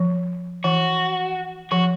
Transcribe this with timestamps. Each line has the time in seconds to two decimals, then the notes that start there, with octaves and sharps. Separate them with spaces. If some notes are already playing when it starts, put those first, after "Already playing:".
Already playing: F3
0.64 E3 F#4
1.71 F3 F#4